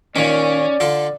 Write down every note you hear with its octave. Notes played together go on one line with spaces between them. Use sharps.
A#2 D#3 C#4 D5
D3 F4 A4